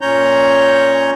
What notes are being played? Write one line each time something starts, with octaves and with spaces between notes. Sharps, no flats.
A#2 C#4 C#5 A#5 G6